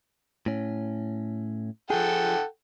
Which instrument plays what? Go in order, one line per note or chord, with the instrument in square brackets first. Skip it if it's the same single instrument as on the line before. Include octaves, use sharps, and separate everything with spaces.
[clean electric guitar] A2 C#4
[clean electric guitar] F3 G#4 [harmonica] A4 F#5 G5